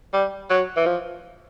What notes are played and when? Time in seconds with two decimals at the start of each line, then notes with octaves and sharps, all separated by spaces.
0.13 G3
0.50 F#3
0.77 E3
0.86 F3